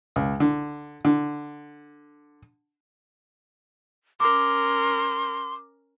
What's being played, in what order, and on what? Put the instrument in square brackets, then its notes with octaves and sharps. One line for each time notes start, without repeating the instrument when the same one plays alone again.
[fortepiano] C#2
D3
D3
[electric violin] C#4 A#4 [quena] C6 [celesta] D6